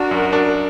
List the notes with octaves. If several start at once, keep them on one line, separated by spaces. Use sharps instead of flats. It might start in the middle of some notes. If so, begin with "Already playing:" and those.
Already playing: D4 F#4 A#4
F#2
D4